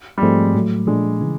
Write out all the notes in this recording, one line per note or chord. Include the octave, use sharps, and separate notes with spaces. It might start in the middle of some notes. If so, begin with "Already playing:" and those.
G3
G#2 F3 G#3 A3 C4
A2 F#3 A3
A#2 F3 G#3 A3 D4
C#3 E3